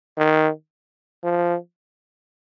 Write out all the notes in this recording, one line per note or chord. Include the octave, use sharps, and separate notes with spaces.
D#3
F3